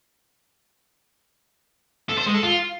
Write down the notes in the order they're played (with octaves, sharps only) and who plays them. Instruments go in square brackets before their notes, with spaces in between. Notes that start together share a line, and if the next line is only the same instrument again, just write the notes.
[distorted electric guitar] A4
C5
G#3
A4
F4